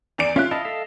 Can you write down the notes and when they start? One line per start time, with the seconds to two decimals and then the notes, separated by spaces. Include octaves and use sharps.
0.18 E2 D5 D7
0.36 C#4 F4 E5 F#6
0.51 E4 D#5 F5 A5
0.65 A4 E5 F5